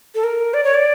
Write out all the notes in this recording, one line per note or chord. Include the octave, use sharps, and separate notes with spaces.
A4
A#4
D5
C#5
D5